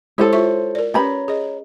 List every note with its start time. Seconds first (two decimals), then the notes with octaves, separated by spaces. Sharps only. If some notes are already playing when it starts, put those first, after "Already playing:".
0.18 G#3 E4 G4 A4 C5 C#5
0.33 F4 E5 C#6
0.75 A#4 D5
0.94 C#4 G4 B4 C#5 A#5 B5
1.28 G#4 D#5